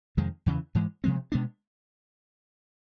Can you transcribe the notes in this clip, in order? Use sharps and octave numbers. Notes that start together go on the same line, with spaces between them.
F2 C3 D#3 G#3
E2 C#3 E3
G#2 E3 G#3
C3 F3 G#3 C4
B2 G#3 B3 D4